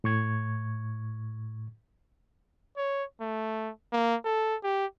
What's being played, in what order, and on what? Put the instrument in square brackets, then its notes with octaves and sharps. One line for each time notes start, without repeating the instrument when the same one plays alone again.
[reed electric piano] A2 C#6 G#6
[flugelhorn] C#5
A3
A#3
A4
G4